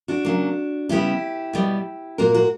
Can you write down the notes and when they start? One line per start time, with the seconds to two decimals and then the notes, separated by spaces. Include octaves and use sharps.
0.08 D4 F#4
0.25 C#3 F#3 A#3
0.89 C#3 G3 B3 E4 G4
1.53 B2 G3 B3
2.18 A#2 A#3 F#4 A#4
2.34 F#4 A#4